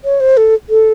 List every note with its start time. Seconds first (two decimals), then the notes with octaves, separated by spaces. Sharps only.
0.04 C#5
0.20 C5
0.37 A4
0.69 A4